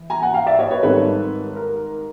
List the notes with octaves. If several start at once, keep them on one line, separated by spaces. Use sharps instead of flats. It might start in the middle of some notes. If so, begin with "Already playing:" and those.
Already playing: E3
G#5 A#5
F#5 G#5
F5 G5
D5 E5
C#5 D#5
B4 C#5
G#2 D#3 G3 C4 A4 B4
A#4